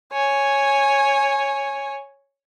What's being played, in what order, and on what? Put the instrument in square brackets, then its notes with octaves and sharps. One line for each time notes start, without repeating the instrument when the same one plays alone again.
[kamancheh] C#5 G#5